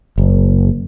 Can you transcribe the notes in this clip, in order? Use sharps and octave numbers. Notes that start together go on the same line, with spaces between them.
F#1